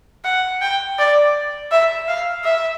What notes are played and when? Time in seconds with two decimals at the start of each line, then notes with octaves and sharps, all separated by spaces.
0.24 F#5
0.61 G5
0.99 D5
1.72 E5
2.08 F5
2.44 E5